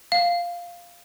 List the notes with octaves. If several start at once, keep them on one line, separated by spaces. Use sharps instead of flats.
F5